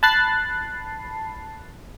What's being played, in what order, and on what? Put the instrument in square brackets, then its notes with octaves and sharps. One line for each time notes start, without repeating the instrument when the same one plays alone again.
[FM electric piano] A5 B5 F#6 A6 C7